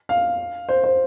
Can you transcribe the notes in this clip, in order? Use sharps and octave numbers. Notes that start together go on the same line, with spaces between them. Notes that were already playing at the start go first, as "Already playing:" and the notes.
F5
C5
C5